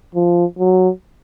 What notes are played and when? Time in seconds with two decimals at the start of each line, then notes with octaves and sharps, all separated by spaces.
0.15 F3
0.59 F#3